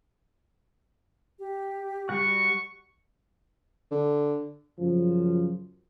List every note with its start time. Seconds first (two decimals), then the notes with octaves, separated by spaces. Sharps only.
1.39 G4
2.09 G3 F#4 F#5 C#6
3.91 D3
4.78 F#2 C#3 F3